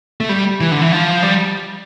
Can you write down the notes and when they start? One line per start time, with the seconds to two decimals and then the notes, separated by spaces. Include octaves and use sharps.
0.21 A3
0.29 G3
0.61 E3
0.72 D3
0.82 E3
0.92 F3
1.23 G3